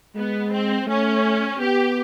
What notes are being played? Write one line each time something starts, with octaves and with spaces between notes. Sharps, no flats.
G#3 B3
C4
A3 C#4
B3 G4